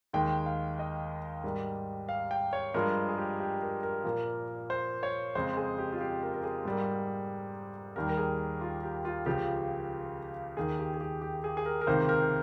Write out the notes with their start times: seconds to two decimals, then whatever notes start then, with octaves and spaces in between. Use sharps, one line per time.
0.13 D#2 D#3 G#3 G5
0.46 F5
0.79 D#5
1.44 G#2 G3 A#3
2.09 F5
2.31 G5
2.53 C#5
2.74 G2 F3 G#3 A#4
3.09 G#4
3.18 G4
3.40 G4
3.62 A#4
3.83 A#4
4.04 A#2 F3 A#3
4.70 C5
5.03 C#5
5.35 F2 C#3 G#3 C5
5.57 G#4
5.78 G4
5.92 F4
6.01 G4
6.23 A#4
6.34 A#4
6.43 G#4
6.65 G#2 G3 A#3
7.96 D#2 D#3 G3 A#3 A#4
8.09 A#4
8.17 G#4
8.61 F4
8.83 G4
9.05 F4
9.26 C#2 C#3 F3 G4
10.57 D#2 D#3 A#3 G#4
10.79 G4
10.94 G#4
11.01 G4
11.22 G4
11.44 G#4
11.57 G#4
11.66 A#4
11.81 A#4
11.87 C#2 C3 D#3 A#3 C5
12.09 A#4